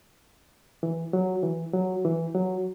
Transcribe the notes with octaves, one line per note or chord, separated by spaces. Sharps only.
E3
F#3
E3
F#3
E3
F#3